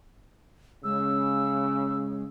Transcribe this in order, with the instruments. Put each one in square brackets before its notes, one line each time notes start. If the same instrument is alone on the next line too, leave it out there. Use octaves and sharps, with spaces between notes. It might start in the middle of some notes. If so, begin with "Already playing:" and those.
[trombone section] C#3 [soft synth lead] G#3 [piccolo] E6